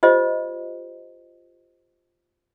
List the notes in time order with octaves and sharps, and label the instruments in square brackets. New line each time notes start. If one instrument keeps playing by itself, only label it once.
[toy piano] F4 G4 C5 D#5